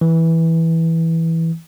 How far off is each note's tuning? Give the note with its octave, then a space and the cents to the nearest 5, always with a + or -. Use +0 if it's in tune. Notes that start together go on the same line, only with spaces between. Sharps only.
E3 -10